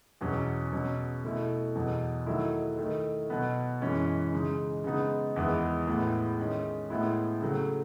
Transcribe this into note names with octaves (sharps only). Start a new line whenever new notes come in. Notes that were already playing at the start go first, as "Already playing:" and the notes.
E2 B2 F#3 C#4
B2 F#3 C#4
B2 A3 E4
E2 B2 F#3
D#3 F#3 A3 E4
D#3 A3 E4
B2 F#3 B3
F#2 E3 G#3 C#4
C#3 G#3 D#4
C#3 G#3 B3 D#4
E2 D#3 G#3 B3 E4
A2 G#3 B3 E4
D#3 G#3 C#4
A2 G#3 B3 E4
C#3 F#3 A3